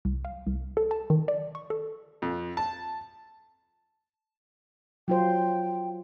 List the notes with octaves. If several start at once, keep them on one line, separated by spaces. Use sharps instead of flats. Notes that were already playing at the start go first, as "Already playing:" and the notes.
C2
F5
C2
A4
A5
D#3
D5
C#6
A4
F2
A5
F#3 F4 C5 G5